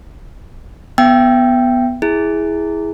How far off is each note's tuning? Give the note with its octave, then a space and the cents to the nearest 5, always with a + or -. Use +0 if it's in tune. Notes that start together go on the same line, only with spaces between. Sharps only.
B3 +5 E5 +35 G5 +0
E4 -10 G#4 +0